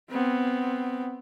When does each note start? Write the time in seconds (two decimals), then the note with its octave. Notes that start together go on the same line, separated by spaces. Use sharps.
0.10 B3 C4